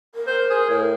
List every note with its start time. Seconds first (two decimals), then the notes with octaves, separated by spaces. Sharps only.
0.15 A#4
0.27 C5
0.50 G#4
0.70 A2